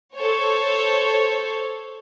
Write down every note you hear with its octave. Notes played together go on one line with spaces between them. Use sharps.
A4 C5 C#5